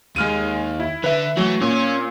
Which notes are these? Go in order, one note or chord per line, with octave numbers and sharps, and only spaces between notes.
D#2 G#3 F6 D#7
E4
D3 B4 E5
E3 F#3 A3
A#2 C#4